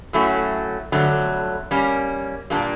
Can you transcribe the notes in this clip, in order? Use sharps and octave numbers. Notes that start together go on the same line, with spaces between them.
A2 F#3 A3 C#4 F#4
F2 D3 F#3 A3
G3 A#3 C#4
A#2 G3 A#3 D4